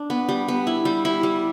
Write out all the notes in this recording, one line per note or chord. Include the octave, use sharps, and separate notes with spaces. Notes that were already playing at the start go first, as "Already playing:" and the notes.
Already playing: D4
B3
G3
B3
E4
G3
E4
G3